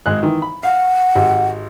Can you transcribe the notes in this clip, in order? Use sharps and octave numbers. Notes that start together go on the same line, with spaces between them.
G#1 G#3 F#6
D#3 E3
B5
F5 F#5
G#1 G4